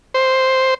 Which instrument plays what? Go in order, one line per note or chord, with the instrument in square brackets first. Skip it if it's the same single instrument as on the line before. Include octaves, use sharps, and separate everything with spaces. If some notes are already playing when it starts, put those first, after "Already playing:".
[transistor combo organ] C5